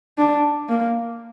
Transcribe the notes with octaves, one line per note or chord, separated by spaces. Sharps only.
D4
A#3